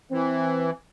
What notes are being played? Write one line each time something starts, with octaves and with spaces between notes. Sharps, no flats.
E3 C4